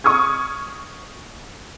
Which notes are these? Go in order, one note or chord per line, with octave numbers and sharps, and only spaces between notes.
C#6 D#6 F6 G#6